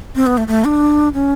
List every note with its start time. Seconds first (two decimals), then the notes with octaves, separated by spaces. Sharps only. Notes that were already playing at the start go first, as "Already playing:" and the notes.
0.15 C4
0.26 B3
0.37 A3
0.48 A3
0.65 D4
1.14 C#4